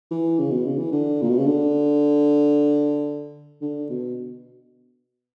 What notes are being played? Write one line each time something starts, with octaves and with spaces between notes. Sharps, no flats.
E3
C#3
B2
C#3
E3
D3
A#2
B2
C#3
D3
D3
B2